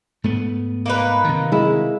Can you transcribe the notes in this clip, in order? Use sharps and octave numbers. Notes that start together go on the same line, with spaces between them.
G#2 A3 B3
A#3 D#4 B4
C3 D#3
G#3 E4